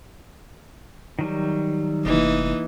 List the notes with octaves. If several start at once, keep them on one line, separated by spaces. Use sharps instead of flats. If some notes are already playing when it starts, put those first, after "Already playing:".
D#3 F#3 G3
F1 E3 A#3 D#4